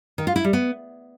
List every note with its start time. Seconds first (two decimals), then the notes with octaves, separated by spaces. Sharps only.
0.18 D#3
0.27 F4
0.36 E4
0.44 G3
0.53 B3